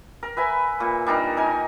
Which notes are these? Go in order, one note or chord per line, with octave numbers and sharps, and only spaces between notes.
A#4
B4 E5 G#5 B5
A#2
G3 D4 D#4 A#4
D#4 A#4 G#5